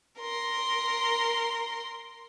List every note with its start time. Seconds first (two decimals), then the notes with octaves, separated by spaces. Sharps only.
0.20 A#4 C6